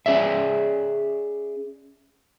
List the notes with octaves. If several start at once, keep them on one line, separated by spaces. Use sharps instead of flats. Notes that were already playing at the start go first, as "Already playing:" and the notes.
C#4 G#4 D5 E5